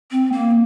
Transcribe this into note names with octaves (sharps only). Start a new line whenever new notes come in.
C4
A#3